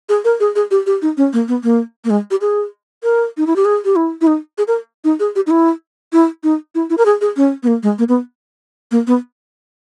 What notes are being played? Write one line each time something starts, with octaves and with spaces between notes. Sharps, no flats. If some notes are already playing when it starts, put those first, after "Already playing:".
G#4
A#4
G#4
G#4
G4
G4
D#4
C#4
A#3
B3
A#3
A#3
G#3
G4
G#4
A#4
D#4
E4
G4
G#4
G4
E4
E4
D#4
G#4
A#4
D#4
G#4
G4
D#4
E4
E4
D#4
E4
E4
A#4
G#4
G#4
C#4
B3
A#3
G#3
A#3
B3
A#3
B3